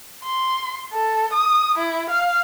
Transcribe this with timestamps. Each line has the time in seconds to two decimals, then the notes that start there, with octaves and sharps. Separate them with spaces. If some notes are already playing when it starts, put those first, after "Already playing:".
0.24 C6
0.93 A4
1.33 D#6
1.78 E4
2.10 F5